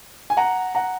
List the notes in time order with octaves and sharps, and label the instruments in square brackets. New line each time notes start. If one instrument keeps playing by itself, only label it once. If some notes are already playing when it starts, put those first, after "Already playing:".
[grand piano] G#5
F#5 A#5
F#5 A#5